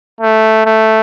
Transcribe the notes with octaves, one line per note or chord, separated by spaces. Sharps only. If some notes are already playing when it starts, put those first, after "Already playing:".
A3
A3